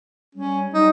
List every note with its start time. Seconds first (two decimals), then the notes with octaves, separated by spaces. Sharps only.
0.35 G3 C#4
0.74 G3 D#4